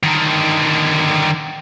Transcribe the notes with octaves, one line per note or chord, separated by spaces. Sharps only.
D3 D#3